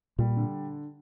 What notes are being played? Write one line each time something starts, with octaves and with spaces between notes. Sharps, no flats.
A#2 G3
D3